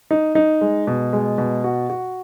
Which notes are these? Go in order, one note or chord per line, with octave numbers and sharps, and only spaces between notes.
D#4
D#4
G#3
B2
G#3
B2
F#4
F#4